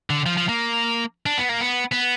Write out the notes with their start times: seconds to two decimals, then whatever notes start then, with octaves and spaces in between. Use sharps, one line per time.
0.10 D3
0.26 F3
0.37 F3
0.49 A#3
1.26 D4
1.38 B3
1.49 A#3
1.61 B3
1.92 B3